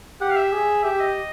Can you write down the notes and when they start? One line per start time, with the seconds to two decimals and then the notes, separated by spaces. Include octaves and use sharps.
0.21 G4 F#5
0.30 F5
0.36 E5
0.52 G#4
0.84 G4 E5
1.00 D#5